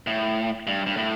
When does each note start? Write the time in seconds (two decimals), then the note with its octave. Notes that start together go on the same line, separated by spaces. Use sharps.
0.07 A2
0.67 G2
0.86 G2
0.97 A2